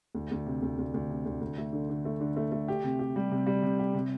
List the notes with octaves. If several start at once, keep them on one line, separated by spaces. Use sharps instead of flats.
D2
D2
C3
D2
D2
D2
C3
D2
D2
A3
D3
D3
A3
D3
A3
A3
G4
C3
G4
G3
C3
G3
C3
G4
C3